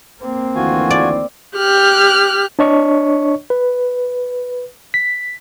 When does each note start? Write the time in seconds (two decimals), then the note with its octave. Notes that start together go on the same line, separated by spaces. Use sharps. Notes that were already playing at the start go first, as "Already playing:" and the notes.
0.22 A#3 C4
0.55 D2 D#3 E3 F4 F#4 G#5
0.91 D5
1.57 G4 F6 F#6
2.59 D4 C#5 D#5 C#6
3.50 B4
4.94 B6